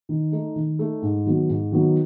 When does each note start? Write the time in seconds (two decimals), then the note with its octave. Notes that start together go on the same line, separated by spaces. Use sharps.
0.09 D#3
0.32 A3 D#4
0.56 D#3
0.79 A3 D#4
1.02 G#2
1.26 D#3 F#3 B3
1.49 G#2
1.72 D#3 F#3 B3